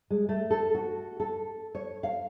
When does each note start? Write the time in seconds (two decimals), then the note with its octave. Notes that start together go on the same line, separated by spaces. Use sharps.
0.10 G#3
0.29 A3
0.50 A4
0.75 F#4
1.20 A4
1.75 C#5
2.03 F5